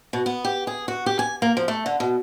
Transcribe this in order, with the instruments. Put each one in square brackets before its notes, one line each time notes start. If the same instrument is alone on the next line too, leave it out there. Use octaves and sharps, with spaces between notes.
[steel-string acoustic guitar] B2
B3
G4
G#4
F#4
G4
G#5
A#3
F3
A3
D3
B2